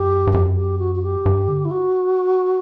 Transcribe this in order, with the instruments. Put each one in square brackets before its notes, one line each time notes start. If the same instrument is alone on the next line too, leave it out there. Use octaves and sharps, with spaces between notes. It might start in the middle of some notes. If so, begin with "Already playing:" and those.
Already playing: [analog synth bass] F#2 [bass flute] G4
[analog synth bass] G2
[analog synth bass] F#2 [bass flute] G4
[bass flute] G4
F#4
F#4
G4
[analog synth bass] G2
D3
[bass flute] E4
F#4